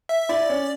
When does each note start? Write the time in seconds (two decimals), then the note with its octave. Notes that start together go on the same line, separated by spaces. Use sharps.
0.09 E5
0.29 E4 D5
0.49 C#4